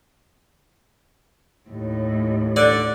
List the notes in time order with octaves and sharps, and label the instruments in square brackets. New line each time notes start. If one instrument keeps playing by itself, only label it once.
[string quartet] D#2 A2
[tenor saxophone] D3 [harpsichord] D5